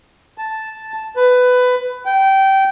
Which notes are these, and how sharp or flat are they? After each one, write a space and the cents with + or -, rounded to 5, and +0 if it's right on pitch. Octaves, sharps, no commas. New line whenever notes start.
A5 -5
B4 +15
G5 -20